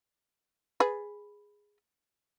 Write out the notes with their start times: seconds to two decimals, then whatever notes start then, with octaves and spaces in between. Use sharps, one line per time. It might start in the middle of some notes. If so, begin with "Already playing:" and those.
0.80 G#4 B4